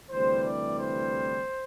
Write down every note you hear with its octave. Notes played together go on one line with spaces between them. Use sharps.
D2 C3 E3 G3 C5
D5
C5